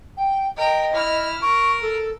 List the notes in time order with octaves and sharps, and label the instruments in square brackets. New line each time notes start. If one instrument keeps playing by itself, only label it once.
[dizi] G5
[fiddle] A#4 G5 [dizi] D#5
[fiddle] E4 F6
[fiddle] A#4 [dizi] C#6
[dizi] A4